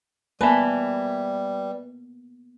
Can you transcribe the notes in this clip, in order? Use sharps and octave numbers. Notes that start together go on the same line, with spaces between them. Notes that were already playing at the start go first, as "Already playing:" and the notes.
G3 A#3 B3 B4 E5 G#5 A5 B5